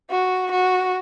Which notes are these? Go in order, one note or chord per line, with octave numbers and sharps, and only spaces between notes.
F#4
F#4